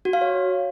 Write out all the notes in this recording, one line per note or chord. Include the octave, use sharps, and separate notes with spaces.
F#4
F5
C#5